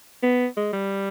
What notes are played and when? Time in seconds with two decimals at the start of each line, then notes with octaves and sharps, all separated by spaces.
0.23 B3
0.57 G#3
0.73 G3